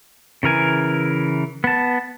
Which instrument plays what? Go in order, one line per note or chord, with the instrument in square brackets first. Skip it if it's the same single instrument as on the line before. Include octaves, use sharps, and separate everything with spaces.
[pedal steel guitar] C#3 E3 A#4 G#5
B3 A5